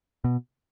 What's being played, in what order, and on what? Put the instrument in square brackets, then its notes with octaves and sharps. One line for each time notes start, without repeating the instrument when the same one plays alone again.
[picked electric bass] B2